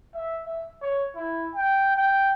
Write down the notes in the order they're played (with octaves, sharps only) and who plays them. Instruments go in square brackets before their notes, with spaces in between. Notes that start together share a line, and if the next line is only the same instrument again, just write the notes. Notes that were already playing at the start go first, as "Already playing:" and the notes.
[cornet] E5
E5
C#5
E4
G5
G5